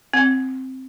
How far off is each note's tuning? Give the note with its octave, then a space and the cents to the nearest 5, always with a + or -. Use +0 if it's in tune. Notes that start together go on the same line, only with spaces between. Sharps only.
C4 +0 F#5 +0